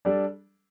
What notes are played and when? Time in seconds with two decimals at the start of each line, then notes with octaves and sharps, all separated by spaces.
0.05 G3 D4 A4 D5